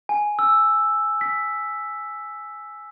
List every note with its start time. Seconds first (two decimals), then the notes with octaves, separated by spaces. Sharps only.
0.09 G#5
0.39 E6
1.21 B6